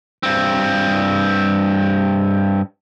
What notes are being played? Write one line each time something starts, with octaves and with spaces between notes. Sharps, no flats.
G2 C4